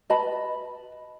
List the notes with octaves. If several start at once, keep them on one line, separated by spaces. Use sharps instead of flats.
B4 D#5 A5 B5